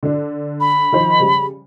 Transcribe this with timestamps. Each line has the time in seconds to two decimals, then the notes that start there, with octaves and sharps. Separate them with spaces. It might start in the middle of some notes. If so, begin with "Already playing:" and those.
0.03 D3 D4
0.60 B5
0.92 D#3 F3 C5
1.19 C#3 G3